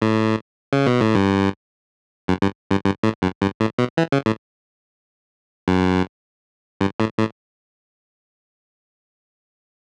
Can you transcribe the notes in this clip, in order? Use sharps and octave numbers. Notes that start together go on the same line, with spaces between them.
A2
C#3
B2
A2
G2
F#2
G2
G2
G2
A2
F#2
G2
A2
B2
E3
C#3
A2
F#2
G2
A2
A2